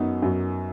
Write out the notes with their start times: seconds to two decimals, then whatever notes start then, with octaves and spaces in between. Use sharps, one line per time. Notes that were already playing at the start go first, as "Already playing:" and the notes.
Already playing: F#2 F#3 B3 D#4
0.22 F#2 F#3